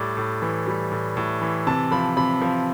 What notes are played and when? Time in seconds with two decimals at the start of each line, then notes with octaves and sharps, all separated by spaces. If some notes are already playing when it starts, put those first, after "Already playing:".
Already playing: A2 G3 D5
0.17 A2
0.42 E3
0.67 G3
0.92 A2
1.17 A2
1.42 E3
1.67 C3 A5
1.91 F3 B5
2.17 C3 B5
2.42 F3